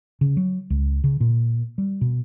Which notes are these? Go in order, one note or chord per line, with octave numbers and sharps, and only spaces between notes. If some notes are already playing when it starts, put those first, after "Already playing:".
C#3
F#3
C#2
C#3
A#2
G3
B2